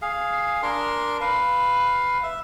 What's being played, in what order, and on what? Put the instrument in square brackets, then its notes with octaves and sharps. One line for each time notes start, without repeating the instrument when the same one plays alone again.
[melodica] G#4 F5
D4 A#4 C6
B4 F5
E5